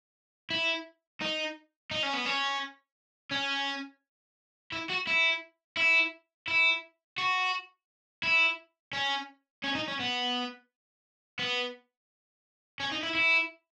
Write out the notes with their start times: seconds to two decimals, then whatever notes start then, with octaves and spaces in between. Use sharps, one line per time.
0.50 E4
1.21 D#4
1.91 D#4
2.03 C#4
2.14 B3
2.26 C#4
3.32 C#4
4.72 E4
4.90 F#4
5.07 E4
5.77 E4
6.48 E4
7.18 F#4
8.23 E4
8.93 C#4
9.64 C#4
9.75 D#4
9.88 C#4
9.99 B3
11.39 B3
12.80 C#4
12.92 D#4
13.03 E4
13.15 E4